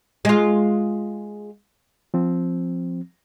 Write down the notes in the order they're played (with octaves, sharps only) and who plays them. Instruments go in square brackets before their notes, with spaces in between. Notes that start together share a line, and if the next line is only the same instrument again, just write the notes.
[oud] G#3 F4
[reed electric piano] F3 C4